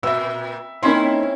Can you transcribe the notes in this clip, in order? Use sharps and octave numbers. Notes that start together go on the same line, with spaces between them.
A#2 E5 E6
A#3 C4 C#4 D#4 E4 C6